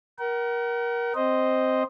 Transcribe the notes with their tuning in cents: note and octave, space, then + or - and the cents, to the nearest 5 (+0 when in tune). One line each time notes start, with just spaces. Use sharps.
A#4 +20 F#5 +45
C4 +0 C5 +0 D#5 +0